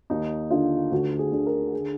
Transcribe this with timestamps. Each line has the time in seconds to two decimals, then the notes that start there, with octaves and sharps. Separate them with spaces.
0.10 D#2 D#4
0.50 D3 F4
0.91 D2 F#4
1.19 G#4
1.32 D3
1.46 A#4
1.73 G#4